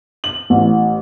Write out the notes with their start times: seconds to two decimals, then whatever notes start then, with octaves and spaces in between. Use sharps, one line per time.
0.24 F#7
0.50 A1